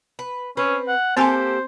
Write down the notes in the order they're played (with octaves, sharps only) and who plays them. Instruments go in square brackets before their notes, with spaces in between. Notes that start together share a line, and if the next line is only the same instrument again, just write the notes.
[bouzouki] B4
[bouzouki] C4 B4 [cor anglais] C#4
[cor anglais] F#5
[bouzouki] A#3 G4 A4 [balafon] C4 G#5 C6 [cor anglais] C5